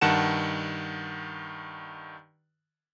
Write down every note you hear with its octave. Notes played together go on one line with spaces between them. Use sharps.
G2 D#3 F#5 A5 E7